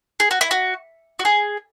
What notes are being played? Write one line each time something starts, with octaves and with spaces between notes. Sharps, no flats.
G#4
F#4
E4
F#4
F#4
G#4